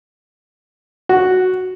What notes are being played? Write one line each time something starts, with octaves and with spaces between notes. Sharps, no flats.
F#4